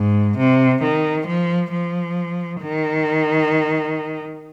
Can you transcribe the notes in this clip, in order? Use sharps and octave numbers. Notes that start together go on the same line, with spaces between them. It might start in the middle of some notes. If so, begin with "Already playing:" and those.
Already playing: G#2
C3
D#3
F3
F3
D#3